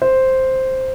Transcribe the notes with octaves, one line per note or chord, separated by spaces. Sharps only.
C5